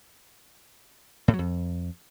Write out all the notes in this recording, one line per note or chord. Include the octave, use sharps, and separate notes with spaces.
A2
F#3
F2